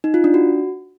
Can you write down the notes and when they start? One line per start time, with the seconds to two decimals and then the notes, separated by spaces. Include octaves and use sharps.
0.04 D#4
0.14 F4
0.24 D4
0.34 F#4